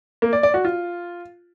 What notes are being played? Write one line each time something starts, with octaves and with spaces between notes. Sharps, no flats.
A#3
D5
D5
F#4
F4